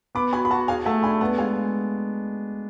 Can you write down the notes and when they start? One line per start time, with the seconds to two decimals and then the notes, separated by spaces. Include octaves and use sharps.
0.15 B3 B5 D6
0.33 F#4 G#5 B5
0.45 B5
0.50 F#4 F#5 A5
0.68 G#4 F5 G#5
0.85 A3 F#5 A5
1.03 D4 G#5 B5
1.21 B3 F#5 A5
1.38 G#3 F5 G#5